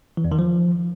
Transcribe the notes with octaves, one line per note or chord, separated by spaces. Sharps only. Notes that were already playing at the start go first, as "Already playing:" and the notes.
E3
E2
D#3
F3